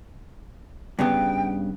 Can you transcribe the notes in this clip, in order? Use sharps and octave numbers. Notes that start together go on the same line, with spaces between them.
G2 C#3 B3 G5